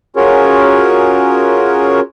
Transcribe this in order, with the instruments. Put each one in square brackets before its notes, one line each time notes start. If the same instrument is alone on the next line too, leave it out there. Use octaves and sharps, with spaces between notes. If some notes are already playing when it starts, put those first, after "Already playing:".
[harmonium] C#4 F4 F#4 G#4 A#4 C#5